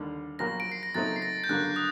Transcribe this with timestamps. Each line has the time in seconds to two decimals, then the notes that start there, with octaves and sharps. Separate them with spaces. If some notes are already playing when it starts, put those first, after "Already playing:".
Already playing: D#2 D3 G3
0.39 A#1 A#2 F#3 A#3 A#6
0.60 D7
0.72 C7
0.83 A#6
0.95 A#2 F#3 A3 C4 D#4 A6
1.16 C7
1.22 A#6
1.44 G6
1.49 G2 D3 F#3 A#3 F#6
1.76 D#6